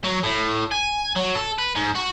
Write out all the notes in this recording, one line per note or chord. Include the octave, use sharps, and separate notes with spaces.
F#3
A2
G#5
F#3
A4
B4
G#2
F#4